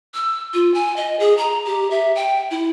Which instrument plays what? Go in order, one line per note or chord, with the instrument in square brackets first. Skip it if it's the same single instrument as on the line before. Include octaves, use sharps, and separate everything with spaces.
[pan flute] E6
F4
G#5
D#5
G#4
A#5
G4
E5
G5
E4